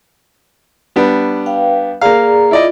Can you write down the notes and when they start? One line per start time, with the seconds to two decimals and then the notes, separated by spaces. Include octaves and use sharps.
0.96 G3 B3 D4
1.46 B4 F5 G5
2.01 A#3 G#4 D5 F5 A#5
2.51 E4 F4 D5 D#5